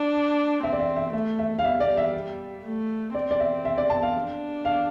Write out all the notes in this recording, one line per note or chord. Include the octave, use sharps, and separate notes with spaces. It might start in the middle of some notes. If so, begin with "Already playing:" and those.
Already playing: D4
C4 E5
D5
E5
E5
A3 E5
E5
F5
G3 E5
D5
E5
A3
C4 D5
D5
E5
E5
D5
A5
F5
D4
F5